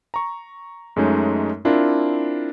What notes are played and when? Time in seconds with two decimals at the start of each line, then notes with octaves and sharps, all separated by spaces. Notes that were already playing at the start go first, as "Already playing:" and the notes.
0.14 A#5 C#6
0.96 F#2 G#3 A3 C#4 D#4
1.65 C4 D4 E4 F4 A#4